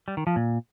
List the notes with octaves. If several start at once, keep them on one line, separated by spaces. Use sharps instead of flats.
G3
D#3
F3
A#2